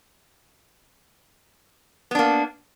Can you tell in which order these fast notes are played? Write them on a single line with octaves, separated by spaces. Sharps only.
B3 D4 A#3